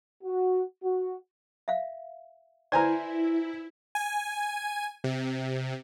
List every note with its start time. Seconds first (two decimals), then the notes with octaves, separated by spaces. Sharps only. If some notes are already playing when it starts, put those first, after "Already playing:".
0.24 F#4
0.84 F#4
1.68 E5 F5
2.72 E4 B4 C5 D5 G#5 A#5
3.95 G#5
5.04 C3